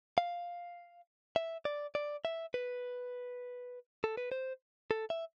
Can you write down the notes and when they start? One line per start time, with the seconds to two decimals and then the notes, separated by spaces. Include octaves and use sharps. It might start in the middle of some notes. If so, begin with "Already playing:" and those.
0.18 F5
1.36 E5
1.65 D5
1.95 D5
2.25 E5
2.54 B4
4.04 A4
4.17 B4
4.32 C5
4.91 A4
5.10 E5